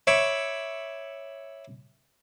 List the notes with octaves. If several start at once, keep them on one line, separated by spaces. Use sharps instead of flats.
C#5 E5 B5 D6